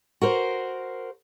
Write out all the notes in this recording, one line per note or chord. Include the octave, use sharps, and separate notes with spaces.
F#4 A#4 C5